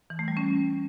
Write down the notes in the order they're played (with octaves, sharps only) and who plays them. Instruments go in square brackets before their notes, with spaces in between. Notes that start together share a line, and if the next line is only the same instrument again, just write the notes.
[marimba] E3
A3
G3
C#4